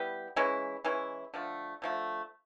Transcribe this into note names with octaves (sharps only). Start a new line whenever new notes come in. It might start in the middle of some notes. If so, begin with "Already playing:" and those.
Already playing: G3 B3 E4 G4
E3 G#3 C#4 E4
E3 G#3 C#4 E4
D3 F3 A3
D3 F3 A3